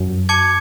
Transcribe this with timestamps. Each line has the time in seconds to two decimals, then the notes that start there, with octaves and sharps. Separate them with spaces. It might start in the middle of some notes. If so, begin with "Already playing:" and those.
Already playing: F#2
0.29 A5 D6 G#6 C#7